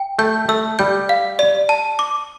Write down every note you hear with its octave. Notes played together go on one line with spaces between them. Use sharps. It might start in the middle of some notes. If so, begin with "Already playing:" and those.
Already playing: G5
A3 G6
A3 E6
G3 G6
F5
D5
A5
D6